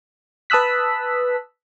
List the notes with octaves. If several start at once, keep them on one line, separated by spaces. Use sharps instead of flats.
B4 A5 D#6 E6 F#6 B6